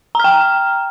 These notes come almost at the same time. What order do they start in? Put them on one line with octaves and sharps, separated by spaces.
A#5 F6 G5